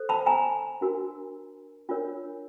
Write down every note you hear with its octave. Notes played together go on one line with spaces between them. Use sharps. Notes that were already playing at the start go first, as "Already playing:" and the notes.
Already playing: A4 C5
A5 B5
G#5 A#5
D4 F#4 A#4
D4 F4 A#4 C#5